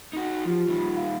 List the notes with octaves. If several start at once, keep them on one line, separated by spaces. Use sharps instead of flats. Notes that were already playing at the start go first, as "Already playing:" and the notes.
D#4 F#4
F3 F4 G4
D#3 G3
F5